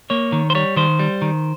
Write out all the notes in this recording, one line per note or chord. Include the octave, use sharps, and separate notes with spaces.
A#3 C#5
D#3
C5
G3 C#5
D#3 C5
G3
D#3